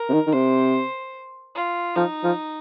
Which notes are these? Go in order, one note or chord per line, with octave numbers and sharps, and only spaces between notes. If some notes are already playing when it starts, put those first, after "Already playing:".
Already playing: A#4
C3
D#3
D#3
C3 C5
F4
F3 D#4
F3